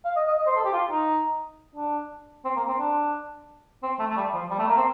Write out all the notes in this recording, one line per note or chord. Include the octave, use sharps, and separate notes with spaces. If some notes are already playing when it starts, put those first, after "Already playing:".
F5
D#5
D#5
D#5
C5
A4
G4
F4
D#4
D4
C4
A#3
C4
D4
C4
A3
A3
G3
F3
G3
A3
A#3
C4